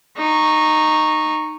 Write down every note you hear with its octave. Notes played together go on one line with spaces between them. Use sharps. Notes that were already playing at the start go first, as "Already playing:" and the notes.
D#4 C#6